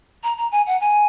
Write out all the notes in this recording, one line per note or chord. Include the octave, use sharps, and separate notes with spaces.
A#5
A#5
G#5
F#5
G#5